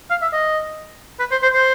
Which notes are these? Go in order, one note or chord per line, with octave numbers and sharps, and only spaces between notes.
F5
E5
D#5
B4
C5
C5
C5